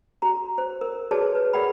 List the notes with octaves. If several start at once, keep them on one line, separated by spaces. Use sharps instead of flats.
F#4 A#5
C5
A#4
F#4 G#4 B4 C#5 D5 A5
B4
G#4 A#4 D5 F#5 G5 B5